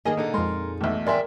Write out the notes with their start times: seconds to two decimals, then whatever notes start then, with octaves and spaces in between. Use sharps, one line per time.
0.05 D#3 A#3 G#4 A4 D#5 G#5
0.17 A#2 D3 A#3 D#4 A4
0.34 F2 G#3 A#4 C6
0.81 B1 E2 A3 E5
1.07 A#4 D5 E5 G5 G#5 C6